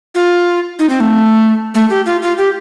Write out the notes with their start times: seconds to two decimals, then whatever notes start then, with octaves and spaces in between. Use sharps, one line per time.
0.15 F4
0.79 D#4
0.90 C4
1.00 A3
1.75 A3
1.90 G4
2.06 F4
2.22 F4
2.38 G4